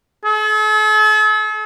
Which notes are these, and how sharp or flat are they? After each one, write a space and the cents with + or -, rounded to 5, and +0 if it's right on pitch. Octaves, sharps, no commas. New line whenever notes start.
A4 -45